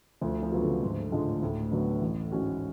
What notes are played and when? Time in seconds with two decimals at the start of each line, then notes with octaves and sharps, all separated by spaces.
0.21 D2 F3
0.43 F3
0.51 C#3 F#3 B3 F4
0.62 D3
0.82 D2 G#2
1.12 A2 D3 G#3 D4 F4
1.42 D2 A2
1.72 D3 F#3 B3
2.01 A1
2.32 G#2 G#3 C#4 F#4